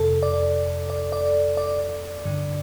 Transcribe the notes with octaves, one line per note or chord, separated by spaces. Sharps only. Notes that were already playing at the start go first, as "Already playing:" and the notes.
Already playing: F2 C3 A4
D5
D5
D5
D5
G2 D3